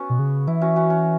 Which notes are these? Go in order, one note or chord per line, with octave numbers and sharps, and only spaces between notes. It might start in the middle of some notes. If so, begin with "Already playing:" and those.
Already playing: B3 C#4 F#4
B2
C#3
E3 E4
C#4 F#4
C#4 F#4
C#4